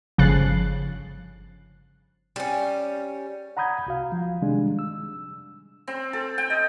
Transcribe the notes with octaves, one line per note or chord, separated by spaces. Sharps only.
G1 C#3 F3 F#6 A6 C7
G3 C#4
F#5 A#5 B5 D#6 G6 G#6
C2 F#4 F5
F3
C3 D#3 G3 G#3 D4
E6
C4
A4
G5
D#5